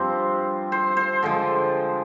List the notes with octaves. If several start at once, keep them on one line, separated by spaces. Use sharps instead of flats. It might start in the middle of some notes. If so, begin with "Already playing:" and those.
Already playing: G2 F3 C4 C5
C5
C5
D3 F3 G#3